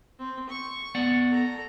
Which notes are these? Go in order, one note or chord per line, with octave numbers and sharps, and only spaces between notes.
C4
C#6
B3 D5 F#5
A4 A#5